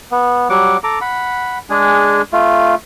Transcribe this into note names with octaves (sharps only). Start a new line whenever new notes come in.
B3
F#3 G3 F#5 D6
A4 A#5 D6
F#5 B5
G#3 D4 G#4
A3 F4